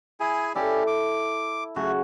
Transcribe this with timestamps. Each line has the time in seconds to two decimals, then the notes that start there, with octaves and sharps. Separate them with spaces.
0.20 E4 G#4 G#5
0.55 C#4 E4 G4 A4 D5
0.87 D6
1.76 C#3 F#3 A3 F#4